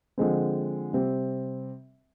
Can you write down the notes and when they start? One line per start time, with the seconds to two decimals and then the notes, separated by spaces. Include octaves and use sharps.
0.18 D3 F3 G#3 C4
0.93 C3 G3 C4